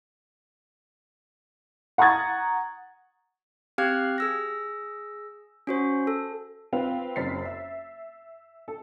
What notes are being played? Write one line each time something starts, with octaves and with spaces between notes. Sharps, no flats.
F#5 A#5 C#6 D#6 G#6 A6
C4 G4 F5 F6 F#6 G#6
G#4 E6 A#6
C#4 F#4 C5
A4
C4 F4 B4 F5
F#1 F#2 C5 A6 B6 C7
E5
A4